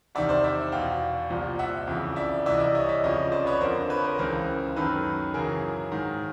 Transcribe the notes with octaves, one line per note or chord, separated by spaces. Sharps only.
E2 C3 D#3 D5 E5
C5 D5
D5 E5
E2 B2 F5 G5
C2 A#2 F3
E5 F#5
F2 C#3 E3
D5 E5
C2 C3 E3 D5 E5
D#5
D5 E5
C#5 D#5
D5 E5
F2 C#3 F3 C#5 D#5
C5 D5
B4 C#5
F2 D3 F3 A#4 C5
B4 C#5
A#4 C5
C#2 C#3 E3 A#4 C5
F#2 D#3 A4 B4
F#2 C#3 E3 G#4 A#4
G#2 D#3